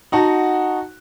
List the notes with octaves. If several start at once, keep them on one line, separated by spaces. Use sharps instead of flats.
D#4 F#4 F#5 A5